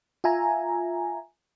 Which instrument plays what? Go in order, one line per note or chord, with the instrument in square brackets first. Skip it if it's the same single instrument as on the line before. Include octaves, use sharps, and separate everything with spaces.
[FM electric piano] F4 E5 G#5 A#5